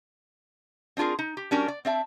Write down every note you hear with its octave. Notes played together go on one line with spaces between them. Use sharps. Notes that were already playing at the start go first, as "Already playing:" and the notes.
C4 D4 F4 G#4 A#4
D#4
G4
G3 C#4 D4 F#4 A#4
D5
C4 D5 E5 A5